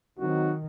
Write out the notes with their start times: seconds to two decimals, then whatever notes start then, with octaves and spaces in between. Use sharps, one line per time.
0.19 D#3 F#3 C4 D#4 F#4